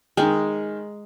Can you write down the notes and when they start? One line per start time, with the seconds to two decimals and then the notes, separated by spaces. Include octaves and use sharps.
0.17 D#3 G#3 G5